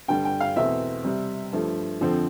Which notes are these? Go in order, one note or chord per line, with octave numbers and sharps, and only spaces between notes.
G2 D3 G3 G5
G5
F5
E2 B2 A3 C4 E5
C3 G3 C4
G2 F3 A3
F2 D3 F3 C4